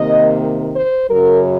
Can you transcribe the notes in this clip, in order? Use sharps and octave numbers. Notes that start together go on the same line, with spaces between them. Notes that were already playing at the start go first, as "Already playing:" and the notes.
Already playing: C3 D#3 A#3 D#5
C5
F#2 C#3 F#3 A#4